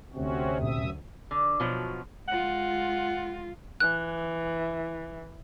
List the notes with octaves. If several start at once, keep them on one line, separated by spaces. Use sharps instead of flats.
D2 C3 C4 C#4 F#4
D#1 F#2 A#2 C#4 E5 D#6
D3
B2 F3 F#3
G#3 F4 F#5
E3 F#6